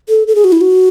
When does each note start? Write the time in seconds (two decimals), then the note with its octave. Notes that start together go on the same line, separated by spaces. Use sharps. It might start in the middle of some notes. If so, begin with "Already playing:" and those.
0.09 A4
0.27 A4
0.35 G#4
0.44 F#4
0.52 E4
0.61 F#4